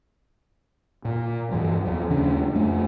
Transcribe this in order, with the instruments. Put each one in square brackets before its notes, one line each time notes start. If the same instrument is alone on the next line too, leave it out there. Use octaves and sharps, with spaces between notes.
[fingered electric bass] A#2
G2 E3 F3
E2 F3
D#2 C#3 C#4 D4
F2 A3 D4